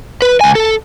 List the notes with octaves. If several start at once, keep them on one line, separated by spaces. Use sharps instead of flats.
B4
C#2 G#5
A4